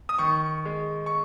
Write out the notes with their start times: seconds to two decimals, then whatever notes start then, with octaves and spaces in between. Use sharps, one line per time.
0.09 D#6
0.18 D#3 C#6
0.65 G#3
1.06 C#6